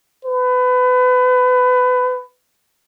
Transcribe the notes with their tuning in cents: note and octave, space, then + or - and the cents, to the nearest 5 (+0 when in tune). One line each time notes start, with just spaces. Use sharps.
B4 +25